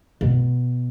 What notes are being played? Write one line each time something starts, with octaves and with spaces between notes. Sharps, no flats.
B2